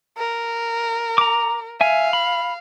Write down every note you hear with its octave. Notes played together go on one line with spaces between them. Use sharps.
A#4
A#5 D6
E5 F5 G#5
B5